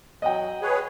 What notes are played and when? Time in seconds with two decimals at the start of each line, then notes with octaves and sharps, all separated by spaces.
0.22 F#3 D#5 F#5 G5
0.62 G#4 B4 C#5